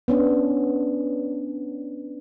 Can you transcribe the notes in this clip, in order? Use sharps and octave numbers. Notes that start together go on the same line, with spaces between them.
B3 C#4 D4